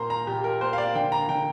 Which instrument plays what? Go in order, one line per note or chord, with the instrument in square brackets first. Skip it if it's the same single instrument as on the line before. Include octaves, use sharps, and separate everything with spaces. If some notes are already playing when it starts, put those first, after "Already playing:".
Already playing: [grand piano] A#2 A#3 C5 A#5 C6
A#5
A#2 G4
A#4
A#3 C5
F5
D5
D3 G5
A#5
D3 G5